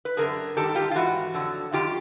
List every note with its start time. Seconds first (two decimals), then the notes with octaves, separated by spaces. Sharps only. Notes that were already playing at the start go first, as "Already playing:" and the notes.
0.05 B4
0.17 F#2 D3 F3 G#4 A#4
0.56 G#2 D#3 G3 G4 A4
0.75 F4 G4
0.91 F4
0.95 G#2 E3 F#4
1.34 F2 D3 F#3
1.72 F#2 D#3 F4 G4